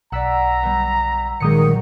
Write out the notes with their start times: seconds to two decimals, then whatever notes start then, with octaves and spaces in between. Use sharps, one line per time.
0.12 B1 D5 F#5 A#5 E6 B6
0.63 G3 B3
1.40 A#2 D#3 F#3 G#3 G4 D#6 C#7